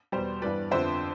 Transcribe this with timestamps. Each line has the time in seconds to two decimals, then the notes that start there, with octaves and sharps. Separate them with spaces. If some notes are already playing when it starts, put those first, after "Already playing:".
0.12 E2 B2 G3 C5
0.42 G2 E3 G3 B3 B4 D5
0.71 F2 D3 F3 B3 C5 E5